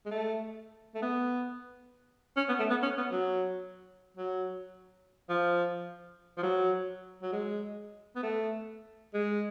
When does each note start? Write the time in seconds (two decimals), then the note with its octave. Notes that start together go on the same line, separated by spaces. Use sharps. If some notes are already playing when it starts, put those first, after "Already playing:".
0.06 G#3
0.11 A3
0.95 A3
1.02 B3
2.37 C#4
2.49 B3
2.59 A3
2.70 B3
2.83 C#4
2.98 B3
3.12 F#3
4.17 F#3
5.29 F3
6.38 F3
6.43 F#3
7.22 F#3
7.32 G#3
8.16 B3
8.23 A3
9.14 G#3